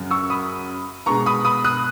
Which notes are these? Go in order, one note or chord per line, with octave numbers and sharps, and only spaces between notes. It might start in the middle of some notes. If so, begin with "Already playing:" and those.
Already playing: F#2 C#3 F#3
C#6 E6
B5 D#6
B2 G#3 B3 A#5 C#6
B5 D#6
B5 D#6
D#6 F#6